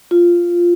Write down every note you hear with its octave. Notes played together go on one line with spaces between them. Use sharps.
F4